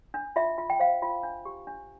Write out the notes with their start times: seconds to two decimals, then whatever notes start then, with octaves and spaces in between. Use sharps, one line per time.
0.14 D4
0.36 F4 E5
0.58 F4
0.70 G5
0.79 C5 F5
1.02 F4
1.23 D4
1.45 G4
1.67 D4